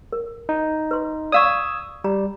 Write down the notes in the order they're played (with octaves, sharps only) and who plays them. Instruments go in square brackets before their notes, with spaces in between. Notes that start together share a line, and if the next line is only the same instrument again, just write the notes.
[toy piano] A#4
[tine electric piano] D#4
[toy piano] B4 C6
[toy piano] D5 F5 C#6 [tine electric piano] D#6 E6 G#6
[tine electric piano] G3 [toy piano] A#5